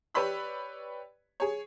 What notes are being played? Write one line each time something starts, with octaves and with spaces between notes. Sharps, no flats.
G4 B4 C#5 D5 B5 E6
G#4 C#5